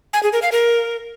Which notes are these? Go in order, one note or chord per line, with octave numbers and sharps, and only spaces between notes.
G#5
G#4
A#4
F5
A#4